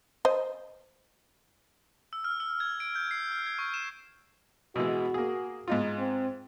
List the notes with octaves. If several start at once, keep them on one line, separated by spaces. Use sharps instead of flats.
C5 D#5
E6
F6
E6
G#6
D7
G6
C7
F6
G#6
C#6
E7
B2 E3 G#3 F#4
A#3 G#4
G#2 D#4 F4
C4